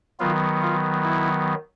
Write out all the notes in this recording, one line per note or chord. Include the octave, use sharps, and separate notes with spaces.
D#3 F#3 B3 F4
F4
E4